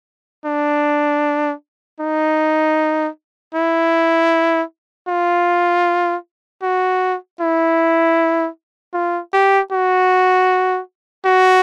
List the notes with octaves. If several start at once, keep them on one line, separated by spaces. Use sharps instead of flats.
D4
D#4
E4
F4
F#4
E4
F4
G4
F#4
F#4